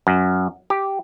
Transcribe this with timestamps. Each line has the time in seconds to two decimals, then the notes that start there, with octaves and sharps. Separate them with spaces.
0.07 F#2
0.70 G4